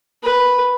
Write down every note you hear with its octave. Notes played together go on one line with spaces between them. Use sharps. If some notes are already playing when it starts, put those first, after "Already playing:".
B4